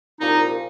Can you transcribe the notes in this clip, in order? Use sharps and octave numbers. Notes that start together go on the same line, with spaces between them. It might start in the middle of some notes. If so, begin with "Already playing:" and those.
C2 A#2 F3 D#4